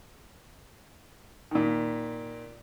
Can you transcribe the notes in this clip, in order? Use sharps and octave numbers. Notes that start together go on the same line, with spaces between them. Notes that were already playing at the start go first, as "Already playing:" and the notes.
A#2 D#3